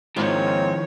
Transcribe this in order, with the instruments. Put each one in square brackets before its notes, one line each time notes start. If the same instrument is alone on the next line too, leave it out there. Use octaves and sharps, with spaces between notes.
[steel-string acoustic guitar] G#2 [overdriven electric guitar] D#3 F3 [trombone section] G#3 A#3 C4 [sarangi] C#5